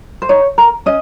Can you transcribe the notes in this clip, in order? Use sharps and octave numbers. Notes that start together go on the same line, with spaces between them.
C5
D#4 C#5
A#4
C#4 D#5